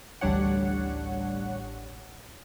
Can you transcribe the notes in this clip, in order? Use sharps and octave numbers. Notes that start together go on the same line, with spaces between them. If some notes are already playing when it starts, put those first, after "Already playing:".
A1 D2 G3 D4 C#5 F#5